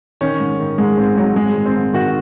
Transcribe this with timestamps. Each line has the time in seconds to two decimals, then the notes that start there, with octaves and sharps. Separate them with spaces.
0.21 D#3 C#4
0.40 G#2
0.60 D#3
0.78 G#2 G#3
0.98 G#2 C4
1.16 G#2 F#3
1.36 G#2 G#3
1.55 D#3
1.66 C4
1.75 G#2
1.93 D#3 F#4